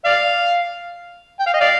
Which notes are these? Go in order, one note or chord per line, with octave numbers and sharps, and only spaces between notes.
D5 F5
G5
F5
D#5
D5 F5